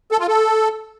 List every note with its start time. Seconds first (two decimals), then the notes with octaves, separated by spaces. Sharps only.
0.12 A4
0.20 F4
0.28 A4